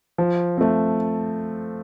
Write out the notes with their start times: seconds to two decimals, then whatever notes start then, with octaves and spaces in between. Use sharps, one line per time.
0.18 F3
0.58 A3 C4